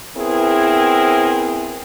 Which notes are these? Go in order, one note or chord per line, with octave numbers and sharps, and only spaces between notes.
B3 C4 E4 G#4 A#4